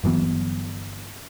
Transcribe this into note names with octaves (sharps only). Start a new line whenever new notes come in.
G1 E3 F#3 B3